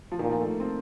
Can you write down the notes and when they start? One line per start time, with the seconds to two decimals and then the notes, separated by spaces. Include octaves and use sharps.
0.12 F3
0.19 A#2 D#3
0.30 F3
0.39 A3
0.49 A#3
0.60 C4